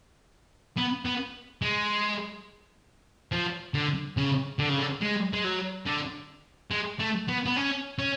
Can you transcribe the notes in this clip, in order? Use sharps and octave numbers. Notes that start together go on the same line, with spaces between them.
B3
B3
G#3
F3
D3
C#3
D3
C#3
D3
G#3
G#3
F#3
D3
G#3
A3
B3
B3
C#4
C#4